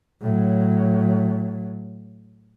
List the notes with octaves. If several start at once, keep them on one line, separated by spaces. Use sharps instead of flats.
A2 F#3